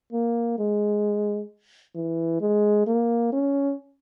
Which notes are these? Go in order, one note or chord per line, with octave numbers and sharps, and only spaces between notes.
A#3
G#3
E3
G#3
A#3
C#4